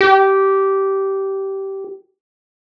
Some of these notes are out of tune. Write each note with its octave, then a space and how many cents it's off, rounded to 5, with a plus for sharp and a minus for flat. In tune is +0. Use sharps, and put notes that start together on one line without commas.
G4 -15